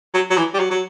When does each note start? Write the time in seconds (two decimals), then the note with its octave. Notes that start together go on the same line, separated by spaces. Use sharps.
0.14 F#3
0.30 F#3
0.37 E3
0.54 G3
0.60 F#3
0.71 F#3